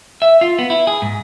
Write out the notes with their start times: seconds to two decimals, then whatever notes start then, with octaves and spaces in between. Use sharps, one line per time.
0.22 E5
0.41 F4
0.59 B3
0.70 E4
0.87 G#4
1.02 G#2